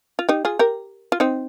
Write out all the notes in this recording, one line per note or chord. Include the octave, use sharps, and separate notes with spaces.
F4
D#4 G4
F4 G#4
G4 A#4
F4
C4 D#4